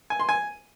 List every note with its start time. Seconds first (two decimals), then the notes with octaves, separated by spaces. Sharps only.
0.10 G#5
0.19 C6
0.29 G#5